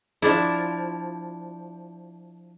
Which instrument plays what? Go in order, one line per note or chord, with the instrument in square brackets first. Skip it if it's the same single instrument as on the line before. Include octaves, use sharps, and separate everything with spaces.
[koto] F3 D4 E4